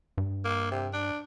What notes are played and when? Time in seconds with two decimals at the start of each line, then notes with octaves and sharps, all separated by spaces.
0.18 G2
0.45 A#3
0.71 C3
0.93 D4